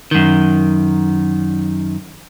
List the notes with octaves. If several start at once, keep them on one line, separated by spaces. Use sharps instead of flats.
F#2 D#3